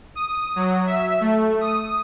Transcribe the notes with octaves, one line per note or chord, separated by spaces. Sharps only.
D#6
F#3
E5
A3
D#6